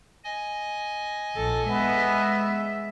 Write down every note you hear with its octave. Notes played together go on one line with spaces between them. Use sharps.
D#5 G#5
A#1 A4
G#3 B3 E5